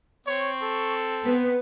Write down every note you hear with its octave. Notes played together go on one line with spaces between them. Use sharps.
C4 C#5 C#6
A4
B3 B4